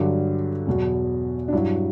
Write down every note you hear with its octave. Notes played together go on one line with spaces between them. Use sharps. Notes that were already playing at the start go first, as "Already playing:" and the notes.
Already playing: G2 D3 F#3 G4
E2 B2 F#3
D4
G2 F#3 E4